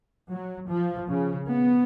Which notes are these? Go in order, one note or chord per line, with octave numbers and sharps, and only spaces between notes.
F#3
F3
C#3
B3